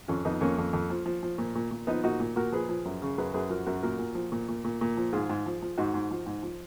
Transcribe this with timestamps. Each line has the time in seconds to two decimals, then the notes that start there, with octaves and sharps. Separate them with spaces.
0.08 F2 C#4 F4
0.25 F2 B3 D#4
0.41 F2 A#3 C#4
0.58 F2
0.73 F2
0.90 F3
1.06 F3
1.23 F3
1.38 A#2
1.55 A#2
1.71 A#2
1.87 F3 B3 D#4
2.04 A#2 D#4 F#4
2.20 A#2
2.36 A#2 F#4 A#4
2.52 F3 G#4 B4
2.69 F3
2.85 F#2
3.02 C#3
3.18 F#2 G#4 B4
3.34 F#2 G#4 B4
3.50 F3 F#4 A#4
3.66 F#2 F#4 A#4
3.83 A#2 F#4 A#4
3.99 A#2
4.15 F3
4.32 A#2
4.48 A#2
4.64 A#2
4.81 A#2
4.97 F3
5.13 G#2 F4 G#4
5.29 G#2
5.46 F3
5.62 F3
5.78 G#2 D#4 F#4
5.94 G#2
6.11 F3
6.26 G#2
6.43 F3